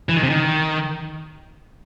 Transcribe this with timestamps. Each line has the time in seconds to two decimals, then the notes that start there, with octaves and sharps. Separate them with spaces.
0.09 E3
0.17 D#3
0.23 C3
0.30 D#3